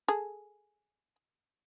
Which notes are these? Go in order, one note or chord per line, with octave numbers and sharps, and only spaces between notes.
G#4 A4